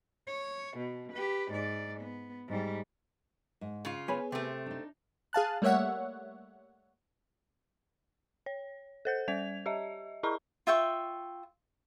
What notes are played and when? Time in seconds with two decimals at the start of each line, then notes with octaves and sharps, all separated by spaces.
0.27 C#5
0.77 B2
1.12 G4 B4
1.51 G#2 D5
2.00 B3
2.48 G#2 G3
3.61 G#2
3.85 C#3 F4
4.08 B3 G#4 B4 C#5 G#5 B5
4.32 C3 A3 C4
4.66 D4 D#4
5.33 G#4 F5 A5 F#6
5.62 G3 A3 A#3 C#5 E5 F#5
8.46 C#5
9.05 A4 C5 G6
9.28 G3 D5 G#6 F7
9.66 G4 D#5 E5
10.23 E4 G#4 D#5 A#5 B5 C#6
10.67 F4 E5 G5 C#6